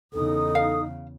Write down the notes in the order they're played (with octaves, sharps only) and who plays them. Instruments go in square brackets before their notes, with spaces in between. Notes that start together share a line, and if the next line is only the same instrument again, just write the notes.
[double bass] E2 C#3 [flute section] D#4 D#6 [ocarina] A4
[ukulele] F5